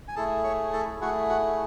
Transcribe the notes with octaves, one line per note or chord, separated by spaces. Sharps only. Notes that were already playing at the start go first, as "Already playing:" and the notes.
G#5
A3 E4 G#4 A4 A5
C#5 C#6
A4 A5
A3 E4 F#4 G#4 F#5
F#4 F#5